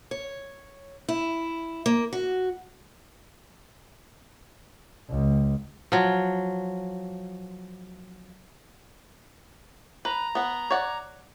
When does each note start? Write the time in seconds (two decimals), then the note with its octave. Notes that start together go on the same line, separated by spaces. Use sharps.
0.11 C#5
1.09 E4
1.86 A#3
2.13 F#4
5.10 C#2
5.92 F3 F#3
10.05 B4 A#5
10.35 B3 F#5
10.70 C#5 D5 F#5